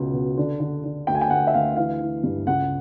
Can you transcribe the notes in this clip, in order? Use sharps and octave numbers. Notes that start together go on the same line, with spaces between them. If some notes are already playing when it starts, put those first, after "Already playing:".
Already playing: C#2 B2
B2
D3
D3
D3
D2 G5
G#5
G5
D2 F#5
E5
D2 F5
E3 F5
E3
G2
C#2 F#5